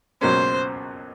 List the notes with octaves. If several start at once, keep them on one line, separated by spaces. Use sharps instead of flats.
C#2 B2 F#3 A#3 C#4 C5